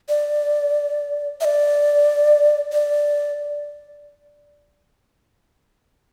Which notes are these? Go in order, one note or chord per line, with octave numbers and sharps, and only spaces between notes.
D5
E5
D5
D5